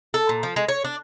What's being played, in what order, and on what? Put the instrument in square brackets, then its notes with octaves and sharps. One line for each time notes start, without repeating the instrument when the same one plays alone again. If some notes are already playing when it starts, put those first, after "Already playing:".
[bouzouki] A4
A#2
F3
G#3
C#5
D4